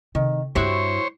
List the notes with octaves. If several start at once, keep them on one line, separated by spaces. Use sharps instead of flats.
C3 D#3
G2 G3 E4 F#4 G4 C5 C#5